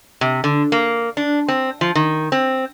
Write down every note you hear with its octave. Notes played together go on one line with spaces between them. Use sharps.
C3
D3
A#3
D4
C4
F3
D#3
C4